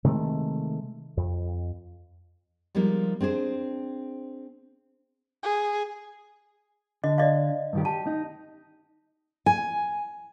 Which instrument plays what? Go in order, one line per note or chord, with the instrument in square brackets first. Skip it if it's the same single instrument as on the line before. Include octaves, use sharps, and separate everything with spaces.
[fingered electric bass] C3 D#3 G#3 A3
F2
[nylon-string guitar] F3 G3 G#3 A#3 D#4
C4 D4 G#4 C5
[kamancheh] G#4
[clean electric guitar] D3 [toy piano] D#5
[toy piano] D5 D#5 F5
[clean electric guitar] G2 D#3 G4
[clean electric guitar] G4 [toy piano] A5
[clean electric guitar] D#4
[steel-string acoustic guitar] G#5